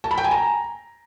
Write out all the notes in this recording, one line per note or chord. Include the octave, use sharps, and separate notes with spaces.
A5
B5
G5
G#5
A#5